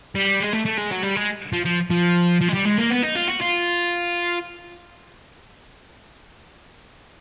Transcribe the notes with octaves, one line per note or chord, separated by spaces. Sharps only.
G3
G#3
A3
A3
G#3
F#3
G3
G#3
F3
F3
F3
F3
G#3
G3
G#3
A#3
B3
D#4
F4
F#4
F4